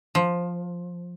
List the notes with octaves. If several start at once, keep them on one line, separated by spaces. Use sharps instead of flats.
F3